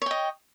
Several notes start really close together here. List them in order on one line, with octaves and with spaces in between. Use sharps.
C#5 G5 D#5